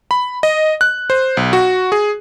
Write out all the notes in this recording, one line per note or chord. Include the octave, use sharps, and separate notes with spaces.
B5
D#5
F#6
C5
B1
F#4
G#4